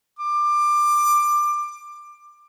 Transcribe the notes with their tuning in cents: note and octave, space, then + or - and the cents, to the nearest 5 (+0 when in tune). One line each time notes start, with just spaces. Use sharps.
D6 +20